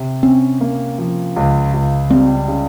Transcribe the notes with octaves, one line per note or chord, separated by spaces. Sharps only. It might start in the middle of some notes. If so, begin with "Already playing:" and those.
Already playing: C3
C4 C#4
A#3
F3
C#2
C#2
G3 C4
C#3